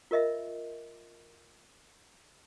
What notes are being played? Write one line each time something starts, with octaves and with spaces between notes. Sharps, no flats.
F4 A#4 D#5 E5